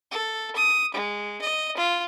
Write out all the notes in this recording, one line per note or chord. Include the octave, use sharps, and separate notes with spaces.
A4
D#6
G#3
D#5
F4